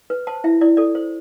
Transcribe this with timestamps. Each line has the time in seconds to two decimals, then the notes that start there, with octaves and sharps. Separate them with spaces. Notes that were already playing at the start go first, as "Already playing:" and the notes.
0.10 B4
0.27 C5 A5
0.44 E4 E5
0.61 E4 D5
0.77 A4 D5
0.95 C5